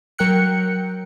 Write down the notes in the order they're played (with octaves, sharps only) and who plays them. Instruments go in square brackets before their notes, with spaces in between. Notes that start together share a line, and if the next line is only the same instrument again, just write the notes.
[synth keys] F#3 A#4 G5 F#6 C#7